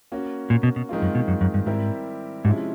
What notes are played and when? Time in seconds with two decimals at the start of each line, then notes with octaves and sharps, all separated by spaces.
0.12 A#3 C#4 F#4
0.50 A#2
0.63 B2
0.76 B2
0.89 G#2 D#3 G#3 C4 F4
1.02 F#2
1.15 B2
1.28 F#2
1.41 F#2
1.54 G2
1.66 G#2 G3 C4 E4 G4 A#4
2.45 G#2 C3 F3 G#3 C#4 E4